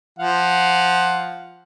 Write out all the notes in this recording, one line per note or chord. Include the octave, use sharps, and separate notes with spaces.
F3 F5 F#5